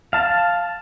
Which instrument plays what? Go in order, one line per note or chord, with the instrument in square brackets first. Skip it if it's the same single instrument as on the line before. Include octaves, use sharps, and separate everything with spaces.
[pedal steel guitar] F5 A5